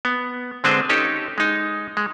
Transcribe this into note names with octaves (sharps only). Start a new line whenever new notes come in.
B3
D3 G#3 C4 D4 B4 C5
C#4 D#4 G4 A4
G#3 D#4
G#3